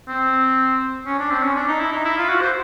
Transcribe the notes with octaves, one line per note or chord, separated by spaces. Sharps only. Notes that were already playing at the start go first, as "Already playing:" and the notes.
C4
C#4
D4
C4
C#4
D4
D#4
E4
D#4
E4
F4
F#4
C5